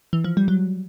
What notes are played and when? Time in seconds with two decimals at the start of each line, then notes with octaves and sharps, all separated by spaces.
0.13 E3
0.24 F3
0.37 G3
0.48 F#3